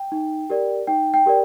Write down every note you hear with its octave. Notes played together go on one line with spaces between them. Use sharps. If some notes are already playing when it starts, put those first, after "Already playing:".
Already playing: G5
D#4
G4 A#4 D5
D#4 G5
G5
G4 A#4 D5